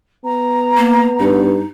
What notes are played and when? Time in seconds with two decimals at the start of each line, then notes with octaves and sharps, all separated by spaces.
0.25 B3 A#5
0.77 A#3
1.20 G2 D#4